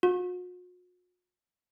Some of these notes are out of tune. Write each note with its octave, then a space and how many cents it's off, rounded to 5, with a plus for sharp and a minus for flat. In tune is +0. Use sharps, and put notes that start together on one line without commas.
F#4 -45